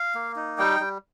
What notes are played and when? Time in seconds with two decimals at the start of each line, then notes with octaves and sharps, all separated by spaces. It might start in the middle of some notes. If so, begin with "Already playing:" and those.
Already playing: F5
0.15 A#3
0.36 D#4
0.58 G3 G5
0.80 G3